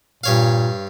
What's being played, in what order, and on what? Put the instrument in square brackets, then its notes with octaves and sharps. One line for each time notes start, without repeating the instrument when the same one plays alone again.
[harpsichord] G2 C#5 F5 [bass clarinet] A#2